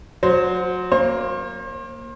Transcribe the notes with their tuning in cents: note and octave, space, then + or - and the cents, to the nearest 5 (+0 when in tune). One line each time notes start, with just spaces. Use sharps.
F#3 -25 C5 +0
A#3 +0 C5 +40